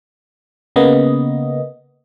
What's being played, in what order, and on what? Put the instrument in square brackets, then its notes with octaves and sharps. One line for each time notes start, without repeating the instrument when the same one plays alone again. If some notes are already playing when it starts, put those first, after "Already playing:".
[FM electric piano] C#3 A#3 B3 D#5